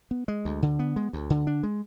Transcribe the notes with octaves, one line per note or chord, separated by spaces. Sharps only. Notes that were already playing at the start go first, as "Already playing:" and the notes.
B3
G#3
D2
D3
B3
G#3
D2
D3
D4
G#3